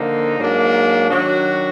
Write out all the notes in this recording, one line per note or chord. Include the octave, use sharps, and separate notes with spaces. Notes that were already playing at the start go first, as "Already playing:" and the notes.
Already playing: D3 F3 A#3 D#4
G#2 F#3 A#3 D4
D#3 F#3 D4 F#4